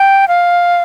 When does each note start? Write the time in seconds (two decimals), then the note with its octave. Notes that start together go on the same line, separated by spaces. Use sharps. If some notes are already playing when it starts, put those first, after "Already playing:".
Already playing: G5
0.28 F5